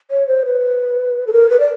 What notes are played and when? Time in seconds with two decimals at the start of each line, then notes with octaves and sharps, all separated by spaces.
0.11 C#5
0.28 C5
0.45 B4
1.27 A4
1.33 A#4
1.50 B4
1.60 D5